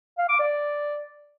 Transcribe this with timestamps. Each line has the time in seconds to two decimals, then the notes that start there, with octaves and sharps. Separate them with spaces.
0.18 F5
0.29 D6
0.39 D5